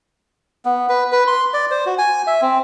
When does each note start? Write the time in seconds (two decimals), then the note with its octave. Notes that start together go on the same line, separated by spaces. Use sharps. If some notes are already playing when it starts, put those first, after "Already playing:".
0.65 B3
0.89 B4
1.12 B4
1.27 C6
1.54 D5
1.71 C5
1.86 F#4
1.98 G#5
2.27 E5
2.42 C4